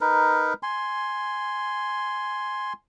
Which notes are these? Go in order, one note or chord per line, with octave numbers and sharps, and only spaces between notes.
D#4 A#4 B4
G#5 C6